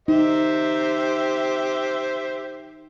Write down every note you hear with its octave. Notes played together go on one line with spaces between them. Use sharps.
D#4 G4 C5 E5